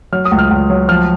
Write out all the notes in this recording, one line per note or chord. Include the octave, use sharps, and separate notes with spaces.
F#3 F6
D#6
C#2
F6
C#2
F#3
F3 F6